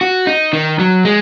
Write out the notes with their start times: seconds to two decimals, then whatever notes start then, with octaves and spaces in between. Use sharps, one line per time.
0.01 F#4
0.27 D#4
0.53 D#3
0.79 F#3
1.05 G#3